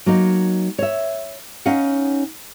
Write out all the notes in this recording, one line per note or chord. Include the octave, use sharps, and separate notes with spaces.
F#3 A#3 D#4
C#5 E5
C#4 D#4 C#5 F5 F#5